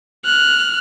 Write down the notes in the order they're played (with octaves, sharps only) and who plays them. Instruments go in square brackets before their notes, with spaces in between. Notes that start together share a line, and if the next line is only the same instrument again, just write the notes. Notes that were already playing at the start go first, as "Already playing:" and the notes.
[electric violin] F6 F#6